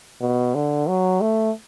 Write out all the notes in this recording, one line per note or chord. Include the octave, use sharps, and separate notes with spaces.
B2
D3
F#3
A3